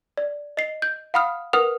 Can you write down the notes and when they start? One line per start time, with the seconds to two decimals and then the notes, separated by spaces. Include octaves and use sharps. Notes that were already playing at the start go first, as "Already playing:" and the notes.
0.17 D5
0.57 D#5 C7
0.82 G6
1.14 F5 F#5 B5 D#6 F6
1.53 A#4 B4 F#5 D#6 F6 F7